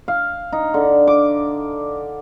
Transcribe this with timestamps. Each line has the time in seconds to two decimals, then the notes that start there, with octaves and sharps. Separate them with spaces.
0.08 F5
0.52 D#4
0.74 D3
1.07 D6